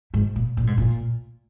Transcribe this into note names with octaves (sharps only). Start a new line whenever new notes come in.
G#2
A#2
A#2
G#2
A#2